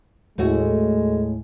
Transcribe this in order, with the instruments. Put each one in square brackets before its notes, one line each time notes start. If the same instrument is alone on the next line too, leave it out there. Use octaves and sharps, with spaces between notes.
[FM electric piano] D#2 [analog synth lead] A2 [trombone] G#3 [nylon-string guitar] A3 C#4 F#4